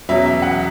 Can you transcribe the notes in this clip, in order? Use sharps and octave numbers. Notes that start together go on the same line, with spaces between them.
E2 B2 F#3 E5
E5
F#5